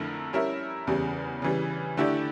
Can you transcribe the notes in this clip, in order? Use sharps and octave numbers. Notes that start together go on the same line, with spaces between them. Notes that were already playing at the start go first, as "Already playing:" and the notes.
Already playing: F2 D3 A3 E4 A#4
G3 C#4 E4 A#4 E5
E2 C#3 G3
C#3 E3 G3
D3 A3 E4 G4 D5